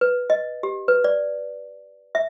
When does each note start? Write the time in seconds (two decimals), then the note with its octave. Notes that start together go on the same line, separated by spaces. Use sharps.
0.01 B4
0.30 D#5
0.63 G4
0.88 B4
1.04 D5
2.15 E5